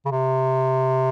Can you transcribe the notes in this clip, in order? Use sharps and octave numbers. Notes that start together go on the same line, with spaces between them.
C#3
C3